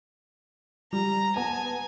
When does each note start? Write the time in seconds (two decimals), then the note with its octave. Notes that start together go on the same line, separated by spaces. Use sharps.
0.93 G3 A#5
1.36 B3 G#5 A5